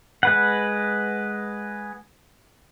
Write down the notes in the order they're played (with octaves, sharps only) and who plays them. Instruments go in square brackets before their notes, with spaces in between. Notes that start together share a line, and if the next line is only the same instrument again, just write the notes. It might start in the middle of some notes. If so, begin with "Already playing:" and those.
[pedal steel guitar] G#3 B4 F#5